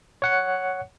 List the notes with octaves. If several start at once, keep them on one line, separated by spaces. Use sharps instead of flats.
C#5 F#5 C#7